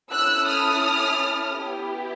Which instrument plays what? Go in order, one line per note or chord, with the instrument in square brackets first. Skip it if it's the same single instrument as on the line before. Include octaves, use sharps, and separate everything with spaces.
[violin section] C#4 E4 A4 E6 F#6
D#6 F6
B3 E4 G4